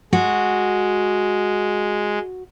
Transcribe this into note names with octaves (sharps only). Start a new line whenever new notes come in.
G#3 F#4